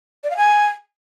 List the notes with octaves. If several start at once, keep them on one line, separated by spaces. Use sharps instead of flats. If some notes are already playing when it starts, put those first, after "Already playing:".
D5
F5
G#5